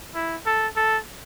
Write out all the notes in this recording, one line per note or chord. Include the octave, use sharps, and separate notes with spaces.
E4
A4
A4